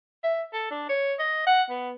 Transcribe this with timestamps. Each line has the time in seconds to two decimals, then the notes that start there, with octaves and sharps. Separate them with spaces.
0.24 E5
0.53 A4
0.71 D4
0.89 C#5
1.19 D#5
1.47 F#5
1.70 B3